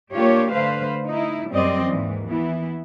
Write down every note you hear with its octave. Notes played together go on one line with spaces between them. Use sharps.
A#3 D4 F4 G4 C#5
D3 A3 B4 C5 F5
D#4 E4
F#2 G3 C4 D5 D#5
D#2 G#2 E3
E3 B3 E4